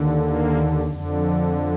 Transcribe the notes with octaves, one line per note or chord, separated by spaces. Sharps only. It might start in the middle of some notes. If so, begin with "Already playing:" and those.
Already playing: D#2 D3
A#3
F2 D3